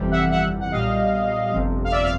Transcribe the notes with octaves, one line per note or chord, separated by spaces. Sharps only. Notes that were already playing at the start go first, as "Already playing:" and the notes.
Already playing: G1 F2 C3 E3 G3
E5 F#5
E5 F#5
F#5
B1 A#2 G3 D#5 F5
G1 F2 C3 F3
F5
D5 E5
F5